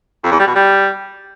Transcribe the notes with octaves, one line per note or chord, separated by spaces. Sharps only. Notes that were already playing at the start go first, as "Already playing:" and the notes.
F2
E2
G3
B2
G3